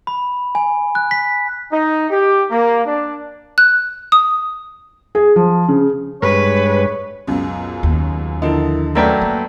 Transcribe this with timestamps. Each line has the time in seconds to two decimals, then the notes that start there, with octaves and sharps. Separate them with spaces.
0.07 B5
0.55 G#5
0.95 F#6
1.11 B6
1.72 D#4
2.10 G4
2.51 A#3
2.85 D4
3.58 F#6
4.12 D#6
5.15 G#4
5.36 F3
5.68 C#3
6.22 G2 G#3 B4 C#5
7.27 C#2 F#2 B2
7.83 D#2
8.42 D3 F3 E4 A#4 D#5
8.95 F#2 A3 A#4 B4 D5 G5 A#5
9.22 A#3